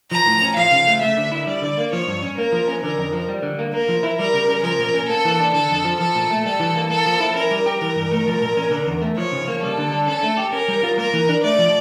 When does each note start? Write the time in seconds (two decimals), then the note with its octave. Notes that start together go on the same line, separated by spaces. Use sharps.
0.11 F3 A#5
0.26 A2
0.42 C#4
0.56 F3 F5
0.71 C#3
0.87 A3
1.01 A3 E5
1.17 D3
1.31 E4
1.47 G3 D5
1.62 D3
1.78 A#3
1.93 F3 C#5
2.07 G2
2.22 C#4
2.38 A#3 A#4
2.52 F3
2.67 C#4
2.83 D3 A#4
2.98 F2
3.13 F3
3.29 G3
3.43 D3
3.59 A#3
3.74 A#3 A#4
3.88 F3
4.03 E4
4.19 G3 A#4
4.34 C#3
4.49 C#4
4.63 F3 A#4
4.79 A#2
4.94 C#4
5.09 A#3 A4
5.25 E3
5.40 D4
5.54 D3 A4
5.70 F2
5.85 F3
6.00 F3 A4
6.15 A#2
6.30 A3
6.45 G3 A4
6.60 E3
6.75 A#3
6.90 A#3 A4
7.06 F3
7.20 E4
7.35 C#4 A#4
7.51 G3
7.66 G4
7.81 E3 A#4
7.96 G2
8.11 A3
8.27 F3
8.41 A#2
8.57 C#4
8.71 D3
8.86 E2
9.02 A3
9.17 F3 C#5
9.32 C#3
9.48 A#3
9.62 G3 A4
9.77 D3
9.92 D4
10.08 C#4 A4
10.23 A3
10.37 G4
10.52 C#4 A#4
10.68 G3
10.83 F4
10.98 A#3 A#4
11.13 E3
11.29 D4
11.44 A3 D5
11.59 F3